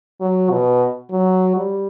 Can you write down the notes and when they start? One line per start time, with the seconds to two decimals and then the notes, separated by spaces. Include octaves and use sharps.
0.21 F#3
0.51 B2
1.11 F#3
1.56 G3